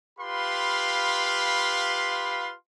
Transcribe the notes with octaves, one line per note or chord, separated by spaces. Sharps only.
F4 G4 B4 F5 B5 C6